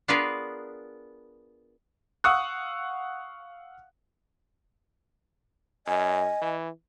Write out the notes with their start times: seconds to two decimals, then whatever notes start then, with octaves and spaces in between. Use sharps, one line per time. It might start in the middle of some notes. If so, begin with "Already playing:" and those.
0.08 B3 D4 F4 G#4 A#4 B4
2.24 F5 F#5 C#6 D#6 E6 F#6
5.87 F#2 D#5 G#5
6.41 E3